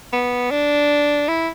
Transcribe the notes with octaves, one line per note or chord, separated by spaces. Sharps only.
B3
D4
E4